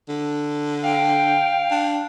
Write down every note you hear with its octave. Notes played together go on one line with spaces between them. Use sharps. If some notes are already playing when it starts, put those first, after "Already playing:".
D3
F5 G5
D4